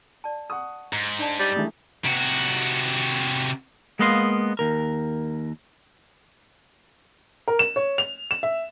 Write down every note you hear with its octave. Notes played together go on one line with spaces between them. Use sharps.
D5 A5
F#5 C#6 D#6
G#2 A#5
D4 D5 A5
G3
C#2 E3 A3 D4 E4 D#6
C3 F#4
G#3 A#3 B3 D#5 F5 C6
D#2 A#4
A#4
E7
C#5
F7
E7
E5